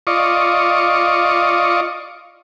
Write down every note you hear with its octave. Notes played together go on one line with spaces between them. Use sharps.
F4 D5 D#5 C#6